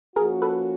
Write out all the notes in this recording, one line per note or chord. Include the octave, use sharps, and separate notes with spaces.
F3 A#3 C#4 F#4 G#4 A#4
A4 B4